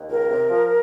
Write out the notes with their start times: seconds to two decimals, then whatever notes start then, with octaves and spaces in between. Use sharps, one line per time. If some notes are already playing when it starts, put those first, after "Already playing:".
Already playing: D#2
0.10 C#2 A#4
0.30 C3
0.50 F3